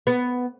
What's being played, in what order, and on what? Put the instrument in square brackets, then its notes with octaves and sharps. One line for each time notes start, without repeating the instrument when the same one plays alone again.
[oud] B3